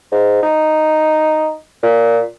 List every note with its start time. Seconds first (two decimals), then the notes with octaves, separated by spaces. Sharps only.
0.12 G#2
0.43 D#4
1.83 A#2